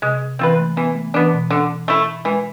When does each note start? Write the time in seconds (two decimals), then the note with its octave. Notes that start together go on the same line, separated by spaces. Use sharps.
0.02 C3 G#3
0.39 E3 C4 F4 B4
0.59 A3
0.77 E3 B3
0.95 A3
1.14 E3 B3 D4
1.32 B2
1.50 D3
1.88 A3 E4
2.25 E3 G#3